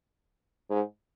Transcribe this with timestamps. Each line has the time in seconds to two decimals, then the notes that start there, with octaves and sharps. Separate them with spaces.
0.70 G#2